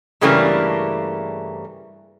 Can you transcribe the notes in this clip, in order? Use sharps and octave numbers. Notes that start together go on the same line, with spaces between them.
G2 C#3 E3 G3 A3 A#3